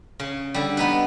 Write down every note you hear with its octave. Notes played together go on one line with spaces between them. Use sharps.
C#3
D3 G3
B3 D#4 B4